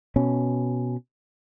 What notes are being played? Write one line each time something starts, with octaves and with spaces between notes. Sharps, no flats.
B2 C#4